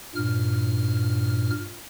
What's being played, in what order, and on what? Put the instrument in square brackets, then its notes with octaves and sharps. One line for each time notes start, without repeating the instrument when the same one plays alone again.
[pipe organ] G2 A#2 F6